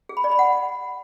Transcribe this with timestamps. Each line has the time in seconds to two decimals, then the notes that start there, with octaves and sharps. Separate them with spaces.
0.09 G#4
0.17 B5
0.24 D5
0.31 B5
0.39 F#5